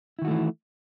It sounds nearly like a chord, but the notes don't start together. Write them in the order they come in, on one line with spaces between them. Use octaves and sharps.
E4 D#3 F#4 A3 E3